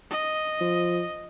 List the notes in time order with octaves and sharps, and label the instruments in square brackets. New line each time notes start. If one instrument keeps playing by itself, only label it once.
[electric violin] D#5
[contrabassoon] F3